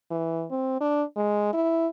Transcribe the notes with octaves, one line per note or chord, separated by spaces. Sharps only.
E3
C4
D4
G#3
E4